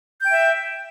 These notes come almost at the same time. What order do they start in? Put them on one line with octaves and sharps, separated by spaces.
G6 G5 E5